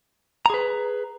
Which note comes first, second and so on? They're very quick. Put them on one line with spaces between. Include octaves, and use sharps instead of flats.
A#5 G#4 B4